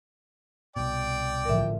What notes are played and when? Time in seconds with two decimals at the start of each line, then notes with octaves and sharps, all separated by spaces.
0.76 C2 B2 D5 G5
1.45 A1 D3 F3 A#4 E5